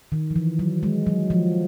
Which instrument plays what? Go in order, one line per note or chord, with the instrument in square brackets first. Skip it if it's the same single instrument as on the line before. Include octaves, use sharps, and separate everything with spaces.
[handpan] D#3
F3
E3
F#3
G#3
F#3
F3